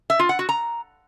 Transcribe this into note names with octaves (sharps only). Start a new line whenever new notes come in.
E5
F4
F#5
F#4
A#5